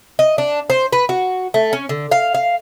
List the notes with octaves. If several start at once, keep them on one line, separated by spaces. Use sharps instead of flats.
D#5
D4
C5
B4
F#4
A3
C#4
D3
F5
F5